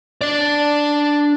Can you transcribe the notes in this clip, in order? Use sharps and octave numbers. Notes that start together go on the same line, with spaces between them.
D4 D5